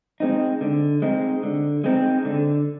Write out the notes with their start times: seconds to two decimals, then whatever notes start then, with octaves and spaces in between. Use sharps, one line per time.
0.20 G#3 C4 D#4
0.61 D3
1.02 G#3 C4 D#4
1.43 D3
1.84 G#3 C4 D#4
2.25 D3